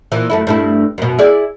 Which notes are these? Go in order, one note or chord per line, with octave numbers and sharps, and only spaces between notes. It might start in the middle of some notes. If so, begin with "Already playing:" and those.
A#2 E3
F#2 A3 E4
G2 A3 E4
F#2 B2
E4 G#4 D5